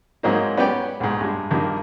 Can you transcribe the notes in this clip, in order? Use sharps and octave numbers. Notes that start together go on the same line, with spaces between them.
G#2 F#3 A#3 C4 D#4
B3 C#4 G4 B4 D5 G5
B1 G#2
G2 G#3
G2 D#3 A#3